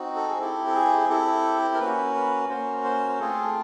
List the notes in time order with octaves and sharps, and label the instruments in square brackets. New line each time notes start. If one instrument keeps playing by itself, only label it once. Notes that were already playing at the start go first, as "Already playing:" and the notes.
Already playing: [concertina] C4 D#4 F#4
A4
G#4
C4 E4 G4 A4
A4
G#4
G#4
C4 E4 G4 A4
A#4
A#3 C#4 F#4 B4
B4
A#3 C#4 F#4 C5
C5
A3 C4 F4 G#4 A4